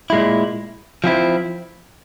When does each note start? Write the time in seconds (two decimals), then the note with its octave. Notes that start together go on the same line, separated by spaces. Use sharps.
0.10 A#2 G#3 E4
1.04 F3 C4 E4